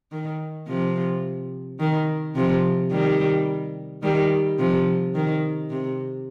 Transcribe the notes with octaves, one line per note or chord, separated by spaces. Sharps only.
D#3
C3 F3
D#3
C3 F3
D#3 G3
D#3 G3
C3 F3
D#3
C3